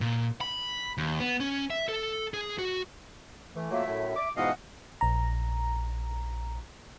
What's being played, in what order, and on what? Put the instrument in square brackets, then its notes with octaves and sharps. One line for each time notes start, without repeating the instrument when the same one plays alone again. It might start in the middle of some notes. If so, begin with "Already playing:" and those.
[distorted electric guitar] A#2
B5
D#2
B3
C#4
E5
A4
G#4
F#4
[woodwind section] E3 [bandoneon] A3
[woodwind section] F3 F#3 A#3 [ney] E5
[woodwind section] F#2 A2
D6
[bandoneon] G#2 B2 D#5 [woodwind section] E3 F3 F5 [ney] F#5
[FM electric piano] A#1 A#5